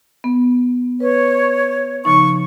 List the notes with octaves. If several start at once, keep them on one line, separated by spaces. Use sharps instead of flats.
B3
B4 C#5
C#3 F3 D#4 C#6